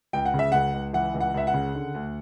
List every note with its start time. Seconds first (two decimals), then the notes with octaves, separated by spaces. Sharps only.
0.13 C#2 G5
0.25 F#5
0.34 C#3
0.39 E5
0.52 C#2 F#5
0.74 C#2
0.93 E3 F#5
1.14 C#2
1.21 F#5
1.34 C#2 E5
1.47 F#5
1.54 C#3
1.75 D3
1.94 D2